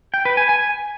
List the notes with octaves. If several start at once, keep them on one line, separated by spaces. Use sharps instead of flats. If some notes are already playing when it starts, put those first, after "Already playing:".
G5
B4
G#5
G#5